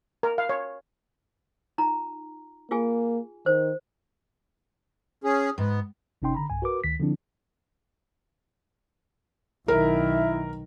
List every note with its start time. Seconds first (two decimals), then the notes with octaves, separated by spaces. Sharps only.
0.23 A#4
0.38 F5
0.49 C#5
1.78 D#4 F4 A#5
2.71 A#3 F4 G#4 G#5
3.46 D#3 C5
5.24 C#4 G#4
5.58 G#2 B3
6.22 G1 C3 C#4 D#4 G5 C6
6.35 D3 A#5 B5
6.50 B1 G2 G#5
6.62 F#4 A#4 B4 D6
6.84 D2 D#3 B6
7.00 D3 F3 C4 D4 E4
9.68 B1 D#3 E4 A#4 E5